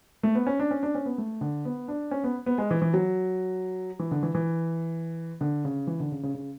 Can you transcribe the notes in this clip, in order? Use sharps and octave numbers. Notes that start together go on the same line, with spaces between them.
A3
B3
C#4
D4
C#4
D4
C#4
B3
A3
D3
B3
D4
C#4
B3
B3
G#3
E3
E3
F#3
E3
D3
E3
E3
D3
C#3
E3
D3
C#3
C#3
C#3